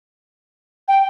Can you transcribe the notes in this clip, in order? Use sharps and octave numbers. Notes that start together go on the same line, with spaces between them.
G5